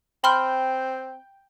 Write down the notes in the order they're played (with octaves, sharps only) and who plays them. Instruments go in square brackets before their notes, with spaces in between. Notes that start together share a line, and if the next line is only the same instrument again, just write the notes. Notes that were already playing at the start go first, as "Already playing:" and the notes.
[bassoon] C4 [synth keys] G5 G6 [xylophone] B5 C6 F6